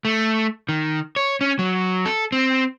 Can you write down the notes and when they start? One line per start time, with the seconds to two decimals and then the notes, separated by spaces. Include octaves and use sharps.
0.05 A3
0.69 D#3
1.16 C#5
1.41 C#4
1.59 F#3
2.06 A4
2.32 C4